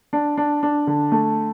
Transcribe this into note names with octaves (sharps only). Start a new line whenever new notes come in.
D4
D4
D4
D3
A3